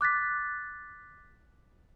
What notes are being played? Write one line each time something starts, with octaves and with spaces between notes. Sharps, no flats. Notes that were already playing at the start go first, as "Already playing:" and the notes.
D6 F#6 A6 B6